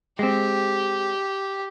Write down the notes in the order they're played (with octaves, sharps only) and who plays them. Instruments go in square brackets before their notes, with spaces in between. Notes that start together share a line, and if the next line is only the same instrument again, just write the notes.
[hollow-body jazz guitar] G#3 C4 [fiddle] G4